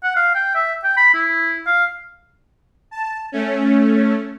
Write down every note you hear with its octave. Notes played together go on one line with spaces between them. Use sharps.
F#5
F5
G5
E5
G5
B5
E4
F5
A5
A3 C#4